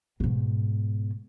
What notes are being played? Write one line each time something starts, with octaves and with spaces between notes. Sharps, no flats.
G#2 B2